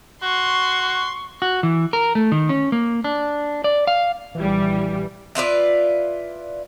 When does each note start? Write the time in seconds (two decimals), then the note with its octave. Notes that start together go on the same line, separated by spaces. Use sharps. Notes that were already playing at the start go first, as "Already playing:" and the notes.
0.23 F#4 C6 C#6
1.42 F#4
1.63 E3
1.93 A#4
2.15 A3
2.32 D#3
2.49 C#4
2.72 A#3
3.04 D4
3.64 D5
3.87 F5
4.35 A#1 E3 G3
5.35 E4 F4 B4 D5